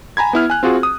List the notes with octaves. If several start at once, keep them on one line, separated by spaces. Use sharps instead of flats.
G#5 A#5 B5 G#6
B3 E4 F6
G#5 F#6
C4 F4 F#4 G#4
D#6